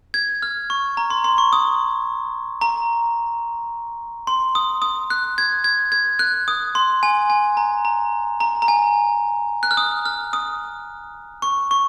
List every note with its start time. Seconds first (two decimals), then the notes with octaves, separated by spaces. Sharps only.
0.14 G#6
0.42 F6
0.70 C#6
0.97 A#5
1.10 C6
1.24 C6
1.38 C#6
1.53 D#6
2.61 A#5
4.27 C6
4.55 D#6
4.82 D#6
5.10 F#6
5.38 G#6
5.64 G#6
5.92 G#6
6.19 F#6
6.48 D#6
6.75 C6
7.03 G#5
7.30 G#5
7.57 A#5
7.85 A#5
8.40 A#5
8.62 A#5
8.68 G#5
9.63 F#6
9.71 F6
9.77 D#6
10.05 F6
10.33 D#6
11.42 C#6
11.71 C#6